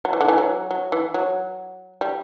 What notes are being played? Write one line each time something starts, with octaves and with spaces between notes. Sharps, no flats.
F#3
E3
D3
E3
F#3
F#3
E3
F#3
G3